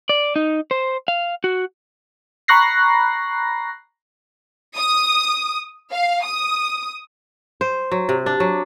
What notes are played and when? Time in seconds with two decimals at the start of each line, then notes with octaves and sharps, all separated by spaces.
0.09 D5
0.36 D#4
0.71 C5
1.08 F5
1.44 F#4
2.48 A#5 B5 C#6 F#6 A#6 C7
4.76 D#6
5.92 F5
6.24 D#6
7.61 C5
7.92 F#3
8.09 C3
8.26 D4
8.40 F#3